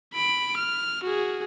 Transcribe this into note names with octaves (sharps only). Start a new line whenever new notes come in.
B5 D7
F6
F#4 G#4